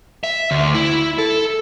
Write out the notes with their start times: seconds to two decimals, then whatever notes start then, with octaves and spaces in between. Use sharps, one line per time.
0.24 E5
0.51 D2
0.74 E4
1.18 A4